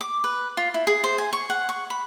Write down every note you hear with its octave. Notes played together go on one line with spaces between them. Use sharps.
D6
B4
F4
E4
G#4
C5
G#5
C#6
F#5
C#6
B5